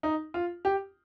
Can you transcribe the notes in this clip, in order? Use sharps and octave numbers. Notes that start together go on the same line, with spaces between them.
D#4
F4
G4